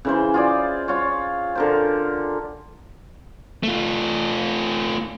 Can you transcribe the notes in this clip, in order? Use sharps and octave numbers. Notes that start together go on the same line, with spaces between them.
C#3 E3 C5
F4 G#4 D5
F4 C#5
D3 A#4 C5
A3 F4